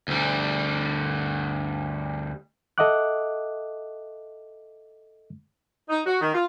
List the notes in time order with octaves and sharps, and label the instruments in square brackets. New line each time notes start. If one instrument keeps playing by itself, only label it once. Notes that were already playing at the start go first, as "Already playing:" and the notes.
[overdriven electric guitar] D2 G3
[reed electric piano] A4 D#5 E5 F#5 D6 F#6
[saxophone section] D#4
F#4
D#3
F4